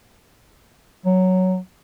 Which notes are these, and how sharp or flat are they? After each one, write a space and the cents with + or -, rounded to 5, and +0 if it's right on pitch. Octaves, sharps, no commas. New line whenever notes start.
F#3 +5